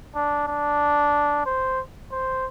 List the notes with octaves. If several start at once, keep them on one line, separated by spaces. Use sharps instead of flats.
D4
D4
C5
C5